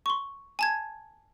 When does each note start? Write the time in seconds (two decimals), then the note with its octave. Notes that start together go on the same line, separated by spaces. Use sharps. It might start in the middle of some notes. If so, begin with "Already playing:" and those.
0.06 C6 C#6
0.59 G#5 A5 G#6